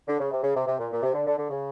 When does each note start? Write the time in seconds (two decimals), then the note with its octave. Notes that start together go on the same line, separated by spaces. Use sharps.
0.08 D3
0.20 C#3
0.32 C3
0.43 C#3
0.56 C3
0.67 C3
0.79 A#2
0.91 A#2
1.03 C3
1.14 D3
1.27 D3
1.38 D3
1.50 C#3